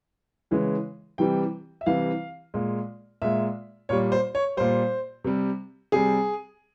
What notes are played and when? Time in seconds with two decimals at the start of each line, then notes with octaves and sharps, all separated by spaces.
0.51 C#3 E3 G#3
1.18 C3 E3 G3 G5
1.81 E5
1.86 C3 E3 G3 F5
2.54 A#2 G#3
3.22 A#2 G#3 E5
3.89 A#2 G3 C#5
4.12 C5
4.35 C#5
4.57 A#2 G3 C5
5.24 C3 G3
5.92 C3 G3 G#4